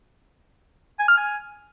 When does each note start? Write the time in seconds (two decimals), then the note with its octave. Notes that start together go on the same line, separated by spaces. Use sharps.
0.99 G#5
1.08 F6
1.17 G#5